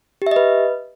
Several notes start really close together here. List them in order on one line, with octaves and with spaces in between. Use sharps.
G4 E5 D#5 B4